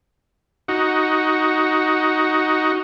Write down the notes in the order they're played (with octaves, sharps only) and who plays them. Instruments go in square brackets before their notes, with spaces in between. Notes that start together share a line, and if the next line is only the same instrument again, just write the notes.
[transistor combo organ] D#4 F#4